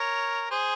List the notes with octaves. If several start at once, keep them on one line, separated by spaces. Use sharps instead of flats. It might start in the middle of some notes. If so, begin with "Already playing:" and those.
Already playing: A#4 C#5
G#4 C5